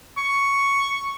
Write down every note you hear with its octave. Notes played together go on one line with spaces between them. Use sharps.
C#6